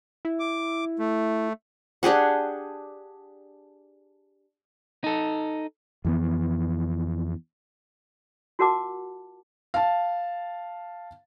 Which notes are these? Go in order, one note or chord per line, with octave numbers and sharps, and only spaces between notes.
E4
D6
A3
D4 G4 G#4 F#5
D#4 A4
F2 E3 B3
F4 F#4 A#4 F#5 A5 D6
F5 A5